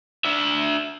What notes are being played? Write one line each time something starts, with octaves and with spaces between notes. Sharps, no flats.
D4 E5